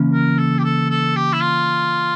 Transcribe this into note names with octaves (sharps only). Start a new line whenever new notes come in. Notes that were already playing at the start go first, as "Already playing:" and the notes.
Already playing: C#3 E3 A#3 C#4
A#4
A4
G4
A4
A4
G4
E4
F4